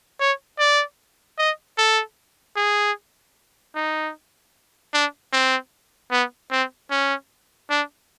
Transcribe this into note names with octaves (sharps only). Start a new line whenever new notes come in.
C#5
D5
D#5
A4
G#4
D#4
D4
C4
B3
C4
C#4
D4